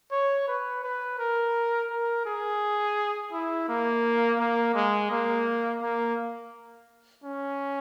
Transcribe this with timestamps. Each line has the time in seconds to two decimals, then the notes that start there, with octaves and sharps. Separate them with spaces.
0.12 C#5
0.48 B4
0.84 B4
1.19 A#4
1.90 A#4
2.26 G#4
3.33 E4
3.68 A#3
4.39 A#3
4.75 G#3
5.11 A#3
5.82 A#3
7.24 C#4